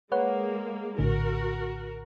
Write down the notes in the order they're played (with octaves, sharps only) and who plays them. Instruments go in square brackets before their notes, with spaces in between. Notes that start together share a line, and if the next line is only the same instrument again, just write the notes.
[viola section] G#3 A#3 [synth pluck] B4 C#5 F#5
[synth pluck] A#1 A2 D3 [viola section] F#4 A#4